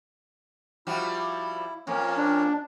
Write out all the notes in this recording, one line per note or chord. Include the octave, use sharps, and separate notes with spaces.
F3 G3 E4 F#4
F2 F3 A#3 C#4 C#5
D4